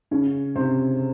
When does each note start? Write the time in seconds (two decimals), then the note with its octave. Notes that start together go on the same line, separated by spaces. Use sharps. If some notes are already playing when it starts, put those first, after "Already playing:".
0.11 C#3 C#4
0.55 C3 C4